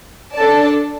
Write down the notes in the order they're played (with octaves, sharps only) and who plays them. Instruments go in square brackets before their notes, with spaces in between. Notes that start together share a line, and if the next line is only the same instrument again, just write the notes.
[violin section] D4 A4 D5 A5